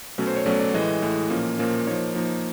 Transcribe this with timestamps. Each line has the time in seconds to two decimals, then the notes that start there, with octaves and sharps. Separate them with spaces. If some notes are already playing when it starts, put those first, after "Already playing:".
0.18 B2 F#3 A3 C#4
0.27 C5
0.36 C#5
0.46 B2 F#3 A3 C#4 D5
0.60 D5
0.74 A2 E3 G#3 D#5
1.02 A2 E3 G#3
1.30 A#2 F3 A#3 C#4
1.58 A#2 F3 A#3 C#4
1.87 F3 A#3 D#4 C#5
2.15 F3 A#3 D#4